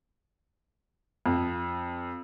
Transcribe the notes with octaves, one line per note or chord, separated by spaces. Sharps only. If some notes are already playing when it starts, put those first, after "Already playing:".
F2